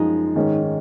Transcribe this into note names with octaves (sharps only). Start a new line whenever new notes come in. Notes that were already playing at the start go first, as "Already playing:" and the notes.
Already playing: F#2 F3 G#3 D#4
G#2 D#3 G#3 C#4